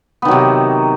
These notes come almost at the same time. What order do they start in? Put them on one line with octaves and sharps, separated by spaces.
B3 D#3 F#3 C3